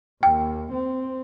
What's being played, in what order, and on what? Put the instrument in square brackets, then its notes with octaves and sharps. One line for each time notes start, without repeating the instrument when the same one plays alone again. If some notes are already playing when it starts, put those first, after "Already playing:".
[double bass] D#2 [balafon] G5
[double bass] C4